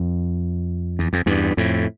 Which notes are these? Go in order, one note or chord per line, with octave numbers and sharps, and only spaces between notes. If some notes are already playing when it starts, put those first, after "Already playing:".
Already playing: F2
E2
F2
E2 G2
F2 A2